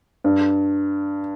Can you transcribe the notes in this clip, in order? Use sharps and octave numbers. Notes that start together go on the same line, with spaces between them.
G2